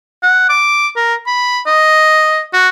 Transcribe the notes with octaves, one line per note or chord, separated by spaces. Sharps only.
F#5
D6
A#4
B5
D#5
F#4